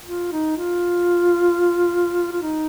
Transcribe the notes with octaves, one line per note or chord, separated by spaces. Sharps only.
F4
D#4
F4
F4
D#4